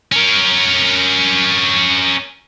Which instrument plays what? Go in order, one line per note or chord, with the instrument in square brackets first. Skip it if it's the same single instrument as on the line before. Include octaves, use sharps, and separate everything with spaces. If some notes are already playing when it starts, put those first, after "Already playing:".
[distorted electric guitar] C#4 A#4